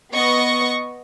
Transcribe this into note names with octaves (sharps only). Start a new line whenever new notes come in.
B3 D#5 C#6